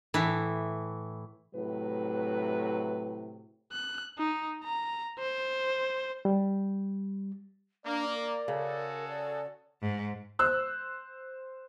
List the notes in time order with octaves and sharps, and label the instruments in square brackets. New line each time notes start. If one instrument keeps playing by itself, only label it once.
[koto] A2 E3
[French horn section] A2 C3 F#3 B4
[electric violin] F#6
D#4
A#5
C5
[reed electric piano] G3
[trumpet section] A#3 [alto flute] D4 [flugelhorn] D5
[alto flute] A#4
[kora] C#3 [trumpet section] F#4 G#4 A4
[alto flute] D5
[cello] G#2
[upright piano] C5 E6 F#6